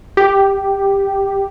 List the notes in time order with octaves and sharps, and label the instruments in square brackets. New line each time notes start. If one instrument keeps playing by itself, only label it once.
[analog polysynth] G4